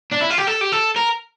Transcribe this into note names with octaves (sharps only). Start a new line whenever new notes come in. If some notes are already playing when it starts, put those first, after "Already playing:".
D4
E4
F4
G4
A4
G4
A4
A#4